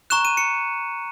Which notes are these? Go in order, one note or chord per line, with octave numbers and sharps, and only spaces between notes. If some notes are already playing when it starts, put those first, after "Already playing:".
A#5 C#6 F#6 E7
D#7
C#7